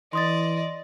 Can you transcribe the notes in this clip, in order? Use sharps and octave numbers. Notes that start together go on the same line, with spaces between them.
E3 D5 D#5 C6 D#6 A6